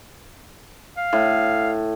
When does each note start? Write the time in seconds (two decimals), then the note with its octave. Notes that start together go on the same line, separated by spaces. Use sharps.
0.97 F5
1.13 A2